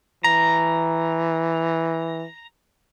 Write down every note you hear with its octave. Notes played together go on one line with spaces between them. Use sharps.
E3 A#5